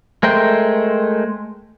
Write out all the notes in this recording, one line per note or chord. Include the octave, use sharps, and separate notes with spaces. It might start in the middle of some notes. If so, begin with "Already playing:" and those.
G#3 A3 A#4 C5 G5